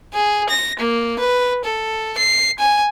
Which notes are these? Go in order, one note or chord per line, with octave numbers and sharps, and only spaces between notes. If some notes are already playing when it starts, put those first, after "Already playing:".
G#4
A#6
A#3
B4
A4
C7
G#5